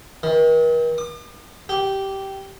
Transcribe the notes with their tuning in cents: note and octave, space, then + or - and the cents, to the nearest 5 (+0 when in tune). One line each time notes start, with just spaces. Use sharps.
D#3 +45
D6 +45
G4 -10